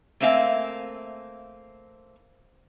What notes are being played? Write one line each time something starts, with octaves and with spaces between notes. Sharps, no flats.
A3 A#3 C4 E5 F5 G#5